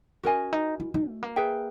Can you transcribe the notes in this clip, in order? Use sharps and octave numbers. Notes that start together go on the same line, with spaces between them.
C#4 F#4 A#4 D#5 G#5
D#4
E4
D#4
A3
A#3
G#4 B4 E5 G5